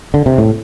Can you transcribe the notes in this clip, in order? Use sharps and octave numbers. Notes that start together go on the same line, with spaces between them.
D3
C3
A2